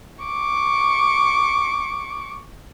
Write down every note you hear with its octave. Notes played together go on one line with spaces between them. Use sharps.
C#6 D6